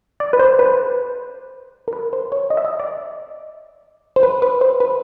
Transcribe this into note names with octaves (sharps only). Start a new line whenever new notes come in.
D5
B4
C5
B4
A#4
B4
C5
C#5
D#5
E5
D#5
D5
C5
B4
B4
C5
B4